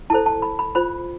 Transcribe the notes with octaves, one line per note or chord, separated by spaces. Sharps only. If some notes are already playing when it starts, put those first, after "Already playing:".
E4 A4 C5 A5
A5
B5
B5
F4 C5 B5